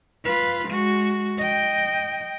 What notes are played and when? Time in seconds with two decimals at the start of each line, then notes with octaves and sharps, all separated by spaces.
0.25 F4 B4
0.68 G#3 F#4
1.38 D#5 G5